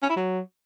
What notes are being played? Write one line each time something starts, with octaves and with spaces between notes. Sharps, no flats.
C#4
E4
F#3